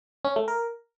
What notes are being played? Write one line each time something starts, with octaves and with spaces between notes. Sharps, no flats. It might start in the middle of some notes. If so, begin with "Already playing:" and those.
C#4
A3
A#4